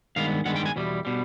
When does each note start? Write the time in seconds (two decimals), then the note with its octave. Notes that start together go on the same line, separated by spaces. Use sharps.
0.16 G2 D#3 G#3 B3 F5
0.45 G2 D#3 G#3 B3 F#5
0.56 G5
0.66 G#5
0.76 E2 B2 G3
1.05 B2 G3